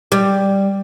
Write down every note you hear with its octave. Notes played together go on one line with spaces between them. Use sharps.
G3